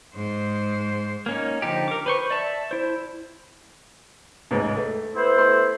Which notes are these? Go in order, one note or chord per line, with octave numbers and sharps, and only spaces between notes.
G#2 C5
A#3 C#4 D#4
D3 F3 D#4 G4
A#4 D6
B4 C5 C#6
D5 E5 A5
E4 C5
A1 D#2 G#2
A3
B3 E4 C5
A3 C6